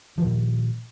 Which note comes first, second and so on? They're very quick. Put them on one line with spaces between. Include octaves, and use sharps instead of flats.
F3 D#3 A#2